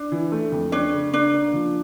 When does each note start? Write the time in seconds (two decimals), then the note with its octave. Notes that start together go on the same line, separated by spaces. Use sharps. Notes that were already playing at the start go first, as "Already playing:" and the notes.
Already playing: D4
0.12 E3
0.32 A3
0.52 F2
0.72 C#4 D4
0.92 C#3
1.13 A#3 D4
1.33 A#3
1.54 F3